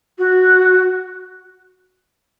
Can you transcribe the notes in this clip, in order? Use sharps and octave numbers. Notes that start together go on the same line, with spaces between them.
F#4